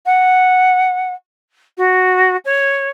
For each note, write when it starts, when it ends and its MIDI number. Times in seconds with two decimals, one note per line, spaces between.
0.06 1.14 78
1.77 2.36 66
2.45 2.90 73